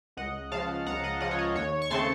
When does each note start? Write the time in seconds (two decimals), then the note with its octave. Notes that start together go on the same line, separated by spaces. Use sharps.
0.17 C#2 D#5 F#5
0.52 C#3 F3 F5 A5
0.86 C#2 F#5 A#5
1.04 D#5 F#5
1.21 C#3 F3 D#5 F#5
1.31 C#5
1.39 D#5
1.55 D#2 C#5
1.82 C#6
1.90 C#3 A3 C4 A5 C6